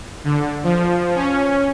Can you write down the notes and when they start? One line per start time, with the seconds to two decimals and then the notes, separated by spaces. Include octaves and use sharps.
0.24 D3
0.64 F3
1.15 C#4